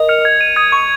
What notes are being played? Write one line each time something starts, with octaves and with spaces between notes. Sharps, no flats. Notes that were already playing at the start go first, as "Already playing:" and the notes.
Already playing: A#4 D#5
F6 C#7 F7
G#6
D#7
D#6 G#6
C#6 D#7